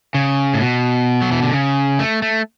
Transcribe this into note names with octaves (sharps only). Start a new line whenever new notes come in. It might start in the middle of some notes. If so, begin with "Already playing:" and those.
C#3
A2
B2
F#3
E3
D3
C#3
A3
A3